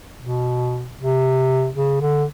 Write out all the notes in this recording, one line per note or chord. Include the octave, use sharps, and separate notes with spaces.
B2
C3
C#3
D3